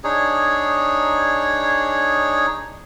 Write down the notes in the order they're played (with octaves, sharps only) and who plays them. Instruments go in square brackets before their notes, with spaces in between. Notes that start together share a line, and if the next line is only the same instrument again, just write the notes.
[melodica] D4 D#4 G#4 C#5